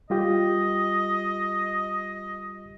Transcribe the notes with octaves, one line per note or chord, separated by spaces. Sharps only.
G3 F4 G4 D#5